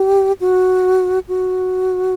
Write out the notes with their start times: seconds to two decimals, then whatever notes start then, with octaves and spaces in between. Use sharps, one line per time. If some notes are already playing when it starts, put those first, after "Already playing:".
Already playing: G4
0.41 F#4
1.28 F#4